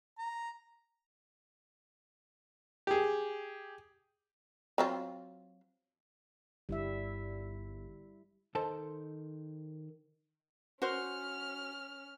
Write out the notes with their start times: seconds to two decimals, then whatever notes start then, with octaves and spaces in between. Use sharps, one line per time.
0.18 A#5
2.87 G4 G#4
4.78 F#3 C4 F4
6.69 G1 G3 E4 E5
8.55 D#3 A4 C5 A5
10.82 C#4 F#4 C5 F6